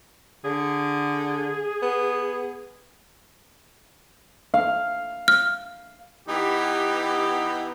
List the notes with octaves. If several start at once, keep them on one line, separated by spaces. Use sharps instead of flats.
D3 G#4
B3
F5
F6
E3 B3 D#4 G4